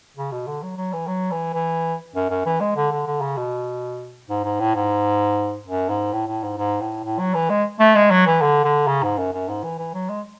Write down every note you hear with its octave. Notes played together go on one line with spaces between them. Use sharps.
C#3
B2
D3
F#3
F#3
E3
F#3
E3
E3
F#2
F#2
E3
G#3
D3
D3
D3
C#3
B2
G#2
G#2
A2
G#2
F#2
G#2
A2
A2
G#2
G#2
A2
A2
F#3
E3
G#3
A3
G#3
F#3
E3
D3
D3
C#3
G#2
F#2
F#2
G#2
E3
E3
F#3
G#3